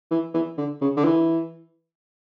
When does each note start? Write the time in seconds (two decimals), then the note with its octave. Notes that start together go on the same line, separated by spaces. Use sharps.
0.11 E3
0.34 E3
0.57 D3
0.81 C#3
0.97 D3
1.04 E3